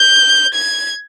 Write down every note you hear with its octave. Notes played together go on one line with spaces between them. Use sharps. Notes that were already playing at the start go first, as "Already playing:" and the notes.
Already playing: G6
G#6